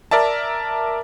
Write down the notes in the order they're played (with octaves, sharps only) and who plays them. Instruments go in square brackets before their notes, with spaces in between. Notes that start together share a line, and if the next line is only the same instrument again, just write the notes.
[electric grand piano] A#4 D5 E5 A5